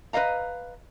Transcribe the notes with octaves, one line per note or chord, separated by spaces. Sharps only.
B4 C5 D#5 F5 A#5